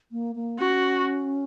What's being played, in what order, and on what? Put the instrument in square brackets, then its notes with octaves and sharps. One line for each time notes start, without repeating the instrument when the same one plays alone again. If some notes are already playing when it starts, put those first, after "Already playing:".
[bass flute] A#3
A#3
[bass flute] C#4 [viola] F#4